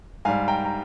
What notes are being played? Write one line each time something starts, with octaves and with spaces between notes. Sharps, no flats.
G#2 G3 F5 G#5
G5 A#5
A#5